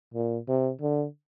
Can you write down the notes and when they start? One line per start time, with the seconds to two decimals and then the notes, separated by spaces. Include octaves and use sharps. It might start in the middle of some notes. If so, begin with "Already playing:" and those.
0.14 A#2
0.48 C3
0.81 D3